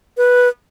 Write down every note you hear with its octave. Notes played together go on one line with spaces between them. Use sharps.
B4